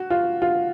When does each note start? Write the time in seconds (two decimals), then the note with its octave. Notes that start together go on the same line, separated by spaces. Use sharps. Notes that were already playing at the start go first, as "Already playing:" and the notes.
Already playing: F#4
0.10 F4
0.42 F4